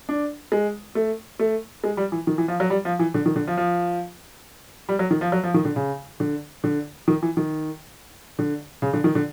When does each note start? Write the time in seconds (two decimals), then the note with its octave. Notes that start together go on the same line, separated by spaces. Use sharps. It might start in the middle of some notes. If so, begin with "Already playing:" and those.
0.09 D4
0.52 G#3
0.95 A3
1.39 A3
1.84 G#3
1.97 G3
2.12 E3
2.27 D#3
2.38 E3
2.48 F3
2.60 F#3
2.70 G3
2.85 F3
2.99 E3
3.14 D3
3.26 D#3
3.36 D3
3.47 F3
3.58 F3
4.89 G3
4.99 F#3
5.11 D#3
5.21 F3
5.32 F#3
5.44 F3
5.54 D#3
5.65 D3
5.76 C#3
6.20 D3
6.64 D3
7.08 D#3
7.22 E3
7.37 D#3
8.39 D3
8.82 C#3
8.93 D3
9.04 D#3
9.15 D3